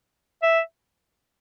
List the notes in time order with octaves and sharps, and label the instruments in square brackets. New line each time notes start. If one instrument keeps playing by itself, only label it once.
[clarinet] E5